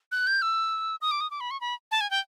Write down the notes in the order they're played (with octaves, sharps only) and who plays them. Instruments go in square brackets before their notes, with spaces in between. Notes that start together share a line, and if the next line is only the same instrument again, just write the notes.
[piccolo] F#6
G6
E6
D#6
D6
D#6
D6
B5
C#6
B5
A5
G#5
G5